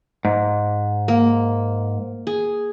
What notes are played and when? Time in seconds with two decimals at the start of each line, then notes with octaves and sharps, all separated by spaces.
0.25 G#2
1.08 A#3
2.27 G#4